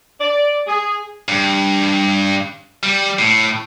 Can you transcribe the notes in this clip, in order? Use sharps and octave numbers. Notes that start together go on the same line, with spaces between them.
D5
G#4
G2
G3
A2